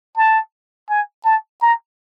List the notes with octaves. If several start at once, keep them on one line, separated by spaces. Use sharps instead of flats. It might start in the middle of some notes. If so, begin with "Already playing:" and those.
A5
G#5
A5
A#5